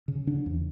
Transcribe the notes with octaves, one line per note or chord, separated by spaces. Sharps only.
C#3
C#3 D4
E2